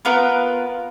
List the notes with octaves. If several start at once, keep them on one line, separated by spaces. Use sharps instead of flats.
B3 F4 A#4 B4